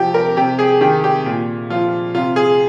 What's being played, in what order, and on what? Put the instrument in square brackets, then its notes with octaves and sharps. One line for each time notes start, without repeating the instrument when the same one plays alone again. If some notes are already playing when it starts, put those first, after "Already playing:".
Already playing: [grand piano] C3 F3 G4
A#4
C3 G4
G#4
D#3 G4
G4
A#2
F3 F4
C3 F4
G#4